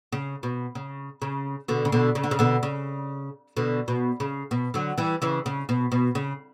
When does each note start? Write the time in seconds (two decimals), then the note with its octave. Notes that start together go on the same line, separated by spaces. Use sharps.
0.12 C#3
0.43 B2
0.75 C#3
1.22 C#3
1.68 B2 D3
1.85 C#3
1.92 B2 D3
2.15 C#3
2.24 D3
2.31 C#3
2.39 B2 D3
2.63 C#3
3.57 B2 D3
3.88 B2
4.20 C#3
4.51 B2
4.74 D3 F#3
4.98 E3 G3
5.22 C#3 E3
5.46 C#3
5.69 B2
5.92 B2
6.15 C#3